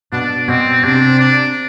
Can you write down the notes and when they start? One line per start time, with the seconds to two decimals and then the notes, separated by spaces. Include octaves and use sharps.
0.12 B2 D4
0.48 B2 C4
0.83 C3 D4
1.19 D4